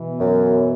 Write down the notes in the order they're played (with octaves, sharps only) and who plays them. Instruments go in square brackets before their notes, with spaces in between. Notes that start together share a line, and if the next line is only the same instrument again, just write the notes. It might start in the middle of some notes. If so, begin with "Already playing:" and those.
Already playing: [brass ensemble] B2 E3
[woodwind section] F#2